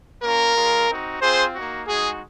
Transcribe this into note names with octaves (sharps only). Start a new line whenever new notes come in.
A#3 C#4 F4 A#4
G#3 C#4 F4
C4 D#4 F#4
C4 F4 G#4 C5
A#3 D#4 F#4
G#3 D#4 F#4 G#4